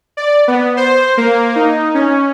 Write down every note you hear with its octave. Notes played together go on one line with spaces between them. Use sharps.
D5
B3
C5
A#3
D#4
C#4